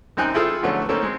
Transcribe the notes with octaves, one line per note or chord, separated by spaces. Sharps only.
F#2 C4 D#4 G5 G#5 F#6
E4 F4 G#4 A4
D3 F#3 A3 B3 C#4
A#3 C4 C#4 D#4 A4
G#3 C4